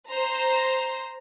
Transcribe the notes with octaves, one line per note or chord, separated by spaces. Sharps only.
C5 A#5